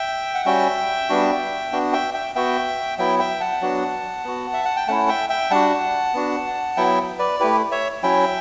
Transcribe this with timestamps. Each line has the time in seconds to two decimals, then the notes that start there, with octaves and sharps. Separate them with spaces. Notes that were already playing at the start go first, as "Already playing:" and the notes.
Already playing: E5 G5
0.35 F#5
0.45 G3 C#4 F#4 E5 G5
1.09 G3 B3 D4 F#4
1.72 B3 D4 F#4
1.93 E5 G5
2.14 E5 G5
2.35 B3 F#4 E5 G5
2.98 F#3 B3 E4 E5 G5
3.19 E5 G5
3.40 F#5 A5
3.62 F#3 B3 D4 F#4
4.24 B3 F#4
4.53 E5
4.65 F#5
4.76 G5
4.88 A3 C#4 E4 F#5 A5
5.08 E5 G5
5.30 E5 G5
5.51 G3 D4 F#4 F#5 A5
6.14 B3 D4 F#4
6.77 F#3 B3 E4 E5 G5
7.19 B4 D5
7.40 A3 E4 G4 B4
7.71 C#5 E5
8.03 F#3 C#4 E4 E5 G5